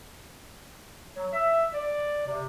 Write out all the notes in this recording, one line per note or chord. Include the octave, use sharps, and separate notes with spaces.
F#3
E5
D5
C3